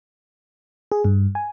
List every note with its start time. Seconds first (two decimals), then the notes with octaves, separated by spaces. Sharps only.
0.92 G#4
1.04 G2
1.35 G#5